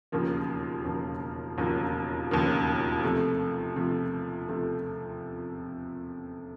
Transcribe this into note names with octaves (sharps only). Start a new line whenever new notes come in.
E1 D#2 C#3 F3 A#3
E1 D#2 C#3 F3 A#3
E1 D#2 C#3 F3 A#3
E1 D#2 C#3 F3 A#3
C3 F3 A3
C3 F3 A3
C3 F3 A3